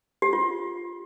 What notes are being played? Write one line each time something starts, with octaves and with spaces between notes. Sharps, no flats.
G4
F4